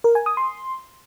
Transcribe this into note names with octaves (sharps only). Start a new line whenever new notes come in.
A#4
G#5
D#6
C6